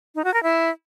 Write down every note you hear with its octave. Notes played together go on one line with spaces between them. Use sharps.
D#4
F#4
A#4
E4